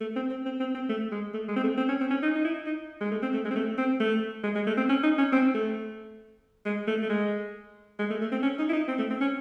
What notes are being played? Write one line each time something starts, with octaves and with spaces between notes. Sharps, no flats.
A3
C4
C4
C4
C4
C4
A3
G#3
A3
G#3
C4
A3
C4
C#4
C4
C#4
D#4
D#4
E4
D#4
G#3
A3
C4
A3
G#3
C4
A3
C4
A3
G#3
G#3
A3
C4
C#4
D#4
C#4
C4
A3
G#3
A3
A3
G#3
G#3
A3
A3
C4
C#4
D#4
E4
D#4
C4
A3
C4
C#4